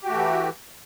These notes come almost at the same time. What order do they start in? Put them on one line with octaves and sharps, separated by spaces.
G4 F#4 A3 E3